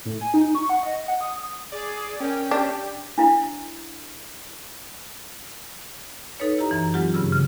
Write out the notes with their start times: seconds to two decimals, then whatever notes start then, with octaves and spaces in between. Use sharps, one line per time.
0.05 A2
0.21 G#5
0.34 D#4
0.55 C#6
0.70 F#5
0.83 D#5
1.08 F#5
1.21 D#6
1.72 G#4 D5
2.20 C#4 A#4 G5
2.51 D4 G4
3.18 D4 E4 F5
6.40 D#4 A4 B4 C#5
6.58 E4 G4 D#5 A#5
6.71 F#2 E3
6.94 F#3 G#3 C4 F4 G4 F#5
7.14 G2 C#3 C#4 G#4 E6
7.32 C#3